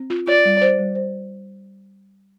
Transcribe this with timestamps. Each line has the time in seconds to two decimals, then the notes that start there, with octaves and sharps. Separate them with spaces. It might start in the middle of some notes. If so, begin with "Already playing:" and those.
Already playing: C4
0.10 F4
0.27 F4 D5
0.45 G3
0.62 C5
0.79 G3
0.95 C5